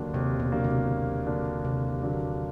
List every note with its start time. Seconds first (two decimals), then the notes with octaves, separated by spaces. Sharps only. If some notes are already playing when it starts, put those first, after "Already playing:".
Already playing: D#2 D3 F#3 A#3 D4
0.14 D#2 C3
0.40 B2
0.52 D3 F#3 A#3 D4
0.64 C3
0.90 D#2
1.27 D3 F#3 A#3 D4
1.64 D#2 C3
2.02 D3 F#3 A#3 D4